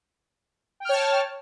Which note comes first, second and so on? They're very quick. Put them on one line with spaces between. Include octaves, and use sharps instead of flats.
G5 F6 C#5 A5